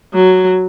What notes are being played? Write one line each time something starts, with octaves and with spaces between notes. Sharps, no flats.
F#3